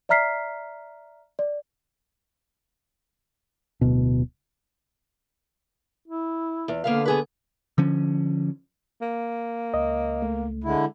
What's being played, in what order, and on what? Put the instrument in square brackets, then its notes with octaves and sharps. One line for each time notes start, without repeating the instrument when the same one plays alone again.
[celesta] D5 E5 A#5 F6 B6 C7
D5
[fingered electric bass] D1 B2
[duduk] E4
[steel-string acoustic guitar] E2
[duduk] D3 [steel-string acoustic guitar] A#3 B3 F5
[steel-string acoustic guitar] B3 G#4 B4
[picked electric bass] D3 F3 C#4
[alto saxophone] A#3
[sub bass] C#2 [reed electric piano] D#5
[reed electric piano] A3
[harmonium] D3 E4 [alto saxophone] G#3